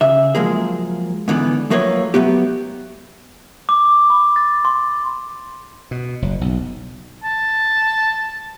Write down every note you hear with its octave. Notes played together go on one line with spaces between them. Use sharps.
C#3 E5
F3 F#3 G#3 A#3 G#4
G#2 D3 E3 B3
F3 F#3 A3 A#3 B4 C#5
F#3 A3 B3 G4
D6
B5
A6
C6
B2
F#1
B1
A5